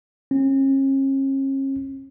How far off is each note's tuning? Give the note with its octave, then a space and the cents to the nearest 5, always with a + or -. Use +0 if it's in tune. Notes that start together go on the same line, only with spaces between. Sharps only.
C#4 -40